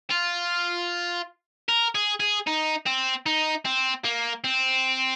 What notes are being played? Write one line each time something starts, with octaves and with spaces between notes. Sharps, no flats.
F4
A#4
G#4
G#4
D#4
C4
D#4
C4
A#3
C4